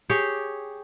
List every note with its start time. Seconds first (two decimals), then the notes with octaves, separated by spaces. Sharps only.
0.10 G4 G#4 C#5 G5